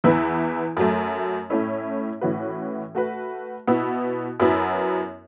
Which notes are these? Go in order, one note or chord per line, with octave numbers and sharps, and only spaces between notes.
E2 E3 B3 E4 B4
F#2 F#3 A3
A2 A3 C#4 E4
A2 E3 C#4 F#4 B4
A3 F#4 B4
B2 B3 E4
F#2 F#3 B3 E4